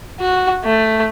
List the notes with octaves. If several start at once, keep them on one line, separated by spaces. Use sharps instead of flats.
F#4
A3